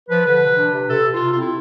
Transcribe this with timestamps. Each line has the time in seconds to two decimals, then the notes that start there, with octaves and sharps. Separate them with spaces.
0.09 F3 B4
0.25 D3 B4
0.42 C3
0.57 D4
0.74 C3
0.90 C3 A4
1.06 C3
1.14 F4
1.23 C3
1.33 F4
1.38 C4 E4